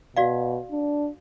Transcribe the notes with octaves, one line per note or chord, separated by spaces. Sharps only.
B2 F#4 D5 F5
D4